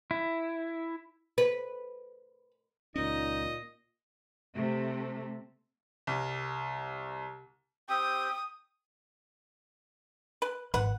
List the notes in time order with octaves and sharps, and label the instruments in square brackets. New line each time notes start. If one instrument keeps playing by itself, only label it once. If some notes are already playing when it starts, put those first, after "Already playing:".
[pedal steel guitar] E4
[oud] B4
[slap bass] C#2 C#4 [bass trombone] A#2 [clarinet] D#4 [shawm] D#5
[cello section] C3 A3
[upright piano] C2
[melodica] C4 G4 [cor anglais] G5 [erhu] D#6
[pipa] B4
[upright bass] G#1 [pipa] B4 F#5